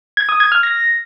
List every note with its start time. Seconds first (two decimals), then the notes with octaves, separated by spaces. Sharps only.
0.17 G#6
0.29 D#6
0.40 G#6
0.52 F6
0.63 A#6